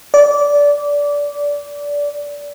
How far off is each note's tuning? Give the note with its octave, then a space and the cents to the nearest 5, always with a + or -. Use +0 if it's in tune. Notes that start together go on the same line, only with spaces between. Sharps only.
D5 -20